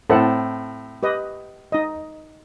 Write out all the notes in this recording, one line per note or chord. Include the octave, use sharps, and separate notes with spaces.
A2 C4 A4 F#5
G4 B4 D#5
D#4 D#5